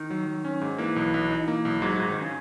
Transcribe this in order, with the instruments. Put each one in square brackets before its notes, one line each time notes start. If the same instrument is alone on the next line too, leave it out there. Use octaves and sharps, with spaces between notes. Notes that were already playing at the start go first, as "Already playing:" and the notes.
Already playing: [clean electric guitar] D#3
[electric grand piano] F#3
F#3
C#4
G#2
[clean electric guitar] E3 [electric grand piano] A#3
[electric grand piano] B1
B1
D#4
A#3
B1
[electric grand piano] G#2 [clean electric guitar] F#3
[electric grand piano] G#2 [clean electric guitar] F#3
[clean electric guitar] D#3
C#3